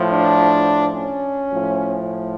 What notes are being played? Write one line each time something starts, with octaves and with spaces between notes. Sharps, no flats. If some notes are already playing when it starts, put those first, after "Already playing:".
Already playing: A2 F3
D4
C#4
A2 F3